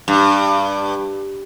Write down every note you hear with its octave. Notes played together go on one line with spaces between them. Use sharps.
G2